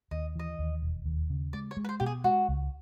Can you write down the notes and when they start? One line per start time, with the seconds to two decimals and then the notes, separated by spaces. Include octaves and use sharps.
0.11 D#2 D#5
0.36 E3 D#5
0.59 D#2
0.82 E1
1.06 D#2
1.30 C#3
1.53 G#3 D5
1.71 C#5
1.77 G#3
1.85 B4
1.89 C5
2.00 B2 G4
2.06 G#4
2.24 G#3 F#4
2.48 C#2